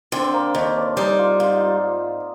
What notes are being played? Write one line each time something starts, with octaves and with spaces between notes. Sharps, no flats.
D3 C4
C4
A#3
D#2
D4
G3 D#4
F4
G#2 F4
F4